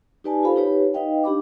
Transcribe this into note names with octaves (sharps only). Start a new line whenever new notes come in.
D#4 G4 B4 D5 G#5 A5
F4 G4 A4 C5 F5 B5
D#4 G4 B4 C#5
D#4 B4 D#5 F5 G5
D4 G4 B5 D6